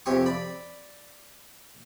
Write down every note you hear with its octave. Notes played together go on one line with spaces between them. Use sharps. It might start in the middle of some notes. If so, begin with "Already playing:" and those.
F2 C3 C4 G4 G#5 C#6
D5 B5